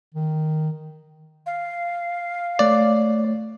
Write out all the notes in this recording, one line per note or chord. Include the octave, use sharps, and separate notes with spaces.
D#3
F5
A3 C#5 D5